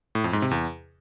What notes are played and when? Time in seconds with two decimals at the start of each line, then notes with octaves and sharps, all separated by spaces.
0.15 A2
0.24 F2
0.33 G#2
0.42 C3
0.51 E2